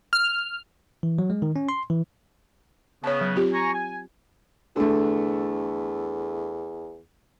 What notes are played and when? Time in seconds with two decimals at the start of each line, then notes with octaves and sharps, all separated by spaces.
0.13 F6
1.03 E3
1.19 F#3
1.30 G#3
1.42 D#3
1.56 C#4
1.69 C6
1.90 E3
3.04 C#3 B3 C#5 A5
3.21 F#3
3.35 C4 F4 G4
3.53 G#5 A#5 C#6
3.73 G#5
4.76 E2 D3 A3